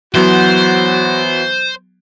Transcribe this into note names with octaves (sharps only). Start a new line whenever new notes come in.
E3 F#3 B3 F#4 C5